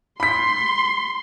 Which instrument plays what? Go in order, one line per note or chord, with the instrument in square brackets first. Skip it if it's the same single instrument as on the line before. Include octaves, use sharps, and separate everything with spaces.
[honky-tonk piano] B5 B6 [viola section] C6